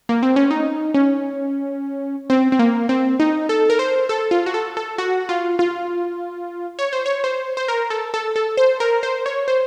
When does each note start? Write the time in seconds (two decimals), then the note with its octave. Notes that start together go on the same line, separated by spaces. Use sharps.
0.09 A#3
0.23 C4
0.36 C#4
0.51 D#4
0.94 C#4
2.30 C4
2.52 C4
2.59 A#3
2.89 C4
3.20 D#4
3.49 A4
3.70 A#4
3.79 C5
4.09 A4
4.31 F4
4.46 F#4
4.54 A4
4.77 A4
4.98 F#4
5.29 F4
5.59 F4
6.79 C#5
6.93 C5
7.06 C#5
7.24 C5
7.57 C5
7.68 A#4
7.90 A4
8.14 A4
8.36 A4
8.57 C5
8.80 A#4
9.03 C5
9.26 C#5
9.48 C5